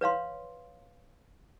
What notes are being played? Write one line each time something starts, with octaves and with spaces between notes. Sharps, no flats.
B4 C#5 F5 C6